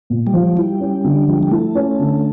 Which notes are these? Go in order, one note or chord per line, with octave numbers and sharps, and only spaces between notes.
A#2
G3
F3
G3 E4
C#4
D3
F3
G3
A3 E4
C#4
D3